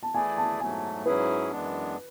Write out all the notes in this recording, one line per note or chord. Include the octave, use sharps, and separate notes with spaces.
A5
E3 A3 E4 G#4 D5 G#5
A5
G#2 F#3 A3 G#5
G#2 F#3 C#4 E4 G#4 B4
F#2 E3 G#3 B3 D4